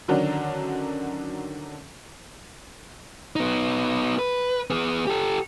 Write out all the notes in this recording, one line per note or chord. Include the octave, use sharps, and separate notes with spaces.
D3 D#3 F#3 C#4 D4
B3 D#4
B4
B3 G#4
G4 A4